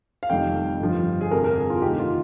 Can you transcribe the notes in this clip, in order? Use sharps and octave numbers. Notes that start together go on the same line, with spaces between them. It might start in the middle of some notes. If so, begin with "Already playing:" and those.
F5
F1 F2 D#3 G3 G5
G1 G2 F3
G#4
G1 F2 C3 A#4
A#4
G#4
F4
D2 C3 D#3 G4
F4